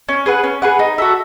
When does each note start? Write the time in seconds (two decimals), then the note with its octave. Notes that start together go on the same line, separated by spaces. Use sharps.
0.09 C#4
0.26 G#4 B4 F#5
0.44 C#4
0.62 G#4 B4 F#5
0.79 D#4
0.98 F#4 A4 E5